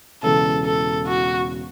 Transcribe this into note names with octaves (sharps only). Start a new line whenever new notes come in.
E1 E2 C#3 A4
A4
F#4